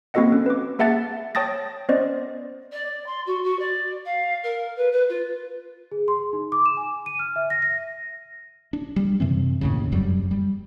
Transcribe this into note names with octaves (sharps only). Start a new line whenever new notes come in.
A#3 C4 F#4 A4 D#5 F#5
C#4
B4 D6
A#3 G#4 E5 F#5 A5 A6
C#5 G5 A5 D#6 A6 A#6
B3 C#4 C5 D5 D#5
D5
D5
C6
F#4
F#4
D5
F5
A#4
B4
B4
F4
G#4
C6
G#4
D#4
D6
E7
G#5
D#7
F6
E5
A#6
A#6
D4
G3
F#2 C3 E3 C4
D#2 A2 C#3
F1 F#2 F#3 G3
G3